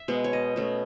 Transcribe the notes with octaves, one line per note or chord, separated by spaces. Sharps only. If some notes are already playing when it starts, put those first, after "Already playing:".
Already playing: E5
B2 G#3 B3
C#5
D#5
B2 A3 C#4